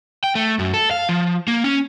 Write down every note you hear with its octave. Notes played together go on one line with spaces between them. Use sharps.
G5
A3
F#2
A4
F5
F3
A#3
C#4